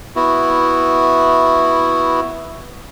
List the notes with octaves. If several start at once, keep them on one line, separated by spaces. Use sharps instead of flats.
B3 E4 F#4